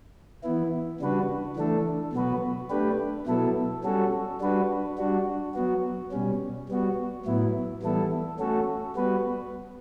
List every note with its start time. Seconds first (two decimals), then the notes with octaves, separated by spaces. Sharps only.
0.44 E3 B3 E4
1.00 C#3 G3 D4 F#4 B4
1.56 E3 A3 D4 A4
2.13 B2 F#3 B3 F#4 B4
2.70 A3 D4 G4 B4
3.27 B2 F#3 B3 E4 A4
3.84 G3 C#4 F#4 A4
4.41 G3 D4 F#4 B4
4.97 G3 D4 F#4
5.54 F#3 B3 F#4
6.12 B2 G3 C#4
6.69 G3 B3 F#4
7.26 A2 F#3 B3 E4
7.82 E3 G3 B3 E4 A4
8.39 A3 C#4 F#4 A4
8.95 G3 B3 F#4 B4